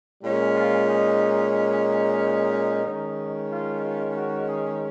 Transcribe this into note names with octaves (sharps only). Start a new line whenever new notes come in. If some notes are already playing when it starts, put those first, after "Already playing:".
A#2 G#3 C#4
F4
D#4
D#4
D#3 G#3 C#4
F4
F4
F#4
G#4